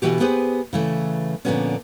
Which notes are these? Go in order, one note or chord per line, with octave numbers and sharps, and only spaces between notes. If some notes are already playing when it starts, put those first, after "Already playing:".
B2 D3 E3 F#4 G4
B3 G4 G#4 B4 C5
C#3 E3 A3
A#2 D3 F3 G3 B3 C#4